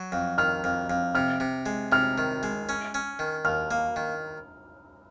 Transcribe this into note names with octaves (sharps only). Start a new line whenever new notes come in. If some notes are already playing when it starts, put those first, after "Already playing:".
Already playing: F#3
F2
D#3 F6
F2
F2
C3 F6
C3
G#3
C3 F6
D#3
G#3
C#4
C#4
D#3
D#2 F6
A#3
D#3